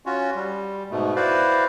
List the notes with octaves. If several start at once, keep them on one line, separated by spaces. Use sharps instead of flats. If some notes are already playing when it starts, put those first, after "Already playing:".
C#4 F4 F#4
G3
G#2 B2 A3
E4 F#4 B4 C5 D5 F5